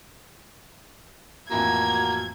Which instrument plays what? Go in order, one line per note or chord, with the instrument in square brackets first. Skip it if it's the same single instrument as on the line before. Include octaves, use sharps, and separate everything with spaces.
[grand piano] F2 A2 E3 [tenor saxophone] A#3 [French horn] F#4 [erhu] G#6